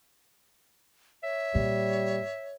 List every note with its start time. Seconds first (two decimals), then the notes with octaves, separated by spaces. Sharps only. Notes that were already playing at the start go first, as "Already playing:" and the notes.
1.23 C#5 E5
1.55 A#2 G3